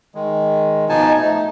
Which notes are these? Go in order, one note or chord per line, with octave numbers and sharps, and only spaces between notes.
D#3 G#3
B2 F3 D#4 G#5 A5
A3 D#4